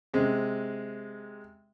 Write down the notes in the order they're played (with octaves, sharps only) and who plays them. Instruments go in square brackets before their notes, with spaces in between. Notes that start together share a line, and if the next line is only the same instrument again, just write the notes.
[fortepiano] C3 G#3